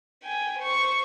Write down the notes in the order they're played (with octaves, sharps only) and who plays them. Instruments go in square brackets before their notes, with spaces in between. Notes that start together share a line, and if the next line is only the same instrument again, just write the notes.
[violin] G5 G#5
C5 C#6